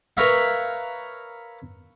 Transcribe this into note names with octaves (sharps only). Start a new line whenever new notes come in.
A#4 B4 C#5 E5 F5